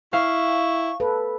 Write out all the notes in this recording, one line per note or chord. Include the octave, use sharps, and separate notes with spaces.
E4 F5 C#6
A4 B4